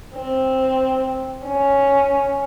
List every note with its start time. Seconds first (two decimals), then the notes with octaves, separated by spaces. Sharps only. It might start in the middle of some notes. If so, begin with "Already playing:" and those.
0.15 C4
1.47 C#4